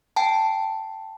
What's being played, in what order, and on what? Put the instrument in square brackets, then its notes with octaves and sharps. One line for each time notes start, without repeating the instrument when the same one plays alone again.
[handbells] G5 A5